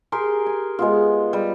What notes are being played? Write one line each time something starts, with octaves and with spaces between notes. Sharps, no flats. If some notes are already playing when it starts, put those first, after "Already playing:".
G4 G#4 A#4 C6
G#5
G#3 B3 F4
G3